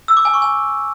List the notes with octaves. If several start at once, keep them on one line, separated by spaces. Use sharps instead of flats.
E6
D6
G#5
C#6
G#5